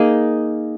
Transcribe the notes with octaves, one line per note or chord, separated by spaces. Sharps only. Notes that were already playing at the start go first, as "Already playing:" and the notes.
Already playing: A#3 D#4 G#4